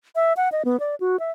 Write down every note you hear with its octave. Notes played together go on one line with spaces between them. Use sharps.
E5
F#5
D#5
B3
D5
F#4
E5